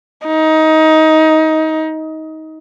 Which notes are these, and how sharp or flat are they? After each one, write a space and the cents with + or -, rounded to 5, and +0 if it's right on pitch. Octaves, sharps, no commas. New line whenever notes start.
D#4 +20